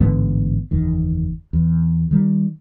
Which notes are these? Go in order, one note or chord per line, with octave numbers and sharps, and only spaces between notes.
A1 G#2 D3 B3
F#1 E2 D#3
E2
D#3 G3